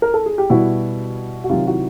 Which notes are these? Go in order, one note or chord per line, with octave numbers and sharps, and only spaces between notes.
A#4
A4
G#4
G4
B2 G3 E4 F#4
F#4
C3 D#3 F#3 F4 G4
E4 F#4